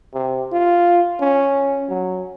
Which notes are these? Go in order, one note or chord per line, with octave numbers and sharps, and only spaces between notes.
C3
F4
C#4
F#3